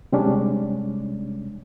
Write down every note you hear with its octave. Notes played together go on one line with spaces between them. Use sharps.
C3 G3 G#3 C#4 D4